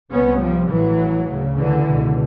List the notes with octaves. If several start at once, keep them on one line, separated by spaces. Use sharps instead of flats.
C2 C3 B3 C#4
F3 G3
A1 A2 E3 F#3
D2 C#3
D3 E3
C#2 B2